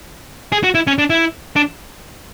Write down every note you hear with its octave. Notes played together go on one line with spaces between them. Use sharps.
G#4
F#4
E4
C#4
D4
E4
D4